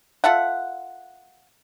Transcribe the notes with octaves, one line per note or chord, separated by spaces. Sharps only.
F4 A4 E5 F#5